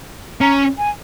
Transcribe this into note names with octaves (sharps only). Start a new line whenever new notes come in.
C#4 A#5
G#5